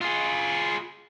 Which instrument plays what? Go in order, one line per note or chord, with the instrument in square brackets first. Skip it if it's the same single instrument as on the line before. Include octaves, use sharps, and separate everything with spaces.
[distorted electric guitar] F4 G#4